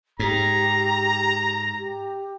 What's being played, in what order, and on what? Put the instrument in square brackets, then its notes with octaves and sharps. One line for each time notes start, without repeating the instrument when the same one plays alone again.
[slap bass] G#2 [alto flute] G4 [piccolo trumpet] A#5
[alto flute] G4